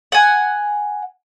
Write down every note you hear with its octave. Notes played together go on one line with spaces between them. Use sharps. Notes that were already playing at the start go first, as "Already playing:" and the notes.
F#5 G#5